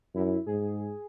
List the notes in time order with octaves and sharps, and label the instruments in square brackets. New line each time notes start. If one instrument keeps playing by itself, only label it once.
[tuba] F#2 [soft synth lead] E4
[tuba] G#2 [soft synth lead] G#4